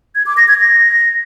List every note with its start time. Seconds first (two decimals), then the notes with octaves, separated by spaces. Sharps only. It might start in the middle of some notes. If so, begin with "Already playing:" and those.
0.15 G#6
0.26 D6
0.37 A#6
0.48 G#6
0.59 A#6